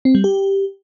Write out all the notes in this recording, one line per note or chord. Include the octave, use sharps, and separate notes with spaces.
C4
G3
G4